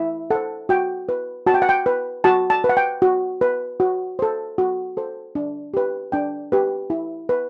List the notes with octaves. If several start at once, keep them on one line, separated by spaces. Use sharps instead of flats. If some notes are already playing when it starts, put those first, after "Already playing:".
Already playing: E4 E5
A4 C5 F#5
F#4 G5
B4
F#4 A5
G5
F#5
G5
B4
F#4 A5
A5
B4
F#5
G5
F#4
B4
F#4
A4 C5
F#4
A4 C5
D4
G4 B4
D4 G5
G4 B4
E4
B4